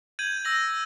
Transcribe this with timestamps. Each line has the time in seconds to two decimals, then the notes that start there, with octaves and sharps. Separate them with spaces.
0.19 G6 G#6 D#7 F#7
0.45 E6 A#6 F#7